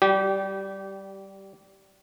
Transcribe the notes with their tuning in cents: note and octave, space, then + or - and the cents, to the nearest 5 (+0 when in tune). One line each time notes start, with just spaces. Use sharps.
G3 -10 G4 -25